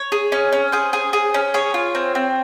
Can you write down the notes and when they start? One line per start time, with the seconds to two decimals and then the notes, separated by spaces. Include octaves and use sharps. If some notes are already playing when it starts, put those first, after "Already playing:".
Already playing: C#5
0.12 G#4
0.32 C#4
0.53 C#4
0.72 G#4 C5
0.93 G#4
1.13 G#4
1.34 C#4
1.54 G#4 C#5
1.74 F4
1.95 C4
2.15 C4